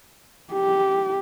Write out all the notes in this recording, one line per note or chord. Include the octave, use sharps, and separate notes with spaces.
G4